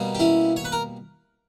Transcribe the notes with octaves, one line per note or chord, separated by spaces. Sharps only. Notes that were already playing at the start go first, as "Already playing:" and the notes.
Already playing: B2 G3 A#3
G4
C#4 E4
C#5
B4
A#4